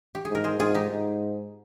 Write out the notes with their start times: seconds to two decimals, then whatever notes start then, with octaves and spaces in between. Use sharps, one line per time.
0.15 G4
0.25 G#2 G#4
0.35 A#4
0.44 G#4 C5
0.59 G#2 F4 G#4
0.74 D#4 G4
0.90 G#2